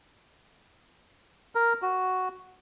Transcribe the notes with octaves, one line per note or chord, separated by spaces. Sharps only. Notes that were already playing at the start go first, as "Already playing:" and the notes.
A#4
F#4